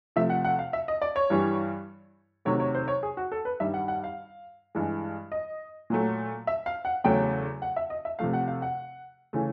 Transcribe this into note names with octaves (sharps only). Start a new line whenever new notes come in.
C3 F3 A3 E5
F#5
F#5
F5
E5
D#5
D5
C#5
G2 E3 G3
C3 D#3 F#3 A3 C#5
C#5
C5
C#5
G#4
F#4
A4
B4
G2 D#3 G3 E5
F#5
F#5
F5
G2 E3 G#3
D#5
A#2 F#3 A3
E5
F5
F#5
E2 C#3 F#3 A3 G5
F#5
E5
D#5
E5
C3 F3 A3 F5
F#5
F5
F#5
C#3 E3 A3